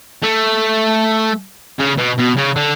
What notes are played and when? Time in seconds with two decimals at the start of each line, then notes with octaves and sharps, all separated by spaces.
0.24 A3
1.79 C#3
1.97 B2
2.18 B2
2.37 C#3
2.56 D3